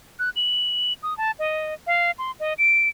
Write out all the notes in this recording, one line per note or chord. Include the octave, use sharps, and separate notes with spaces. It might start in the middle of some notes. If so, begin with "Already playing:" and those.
F#6
F#7
D#6
A5
D#5
F5
C6
D#5
D7